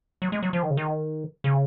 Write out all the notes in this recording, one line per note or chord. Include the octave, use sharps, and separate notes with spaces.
F#3
G#3
F#3
F3
D#3
C#3
D#3
C#3